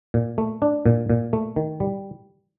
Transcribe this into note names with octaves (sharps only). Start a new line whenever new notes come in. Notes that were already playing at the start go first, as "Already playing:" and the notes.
A#2
A3
D4
A#2
A#2
A3
D#3
G3